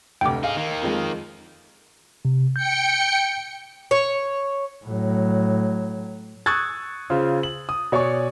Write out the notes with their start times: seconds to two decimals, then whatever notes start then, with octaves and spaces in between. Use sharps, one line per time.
0.21 F1 D2 G5 D6
0.44 D#4 G#4 F5
0.57 D#3 A#3
0.81 F2 F3 G#3
2.25 C3
2.56 G5 G6 C#7
3.91 C#5
4.85 A2 F#3
6.46 C#6 D#6 E6 F#6 G#6 A6
7.10 C#3 F4 C5
7.43 F#7
7.69 D#6
7.92 B2 C#5 D5 G#5 C#6